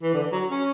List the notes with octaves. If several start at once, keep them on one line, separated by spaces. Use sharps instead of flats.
E3
D3
F#3
C#4